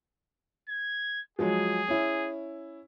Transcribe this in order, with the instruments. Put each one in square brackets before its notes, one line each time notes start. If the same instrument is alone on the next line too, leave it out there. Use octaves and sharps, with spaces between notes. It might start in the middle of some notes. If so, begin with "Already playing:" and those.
[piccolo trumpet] G#6
[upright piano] F3 F#3 G#3 [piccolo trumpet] G#4
[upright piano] C#4 E4